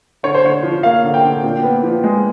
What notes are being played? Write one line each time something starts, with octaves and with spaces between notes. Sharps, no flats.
D3 C#5
C5
D3 C#5
F3
A#3 F5
D3
G5
D3
A#2
B3
F3
G#3